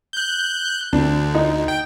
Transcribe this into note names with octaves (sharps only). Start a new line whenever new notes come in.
F#6 G6
D2 D4
D#4
G5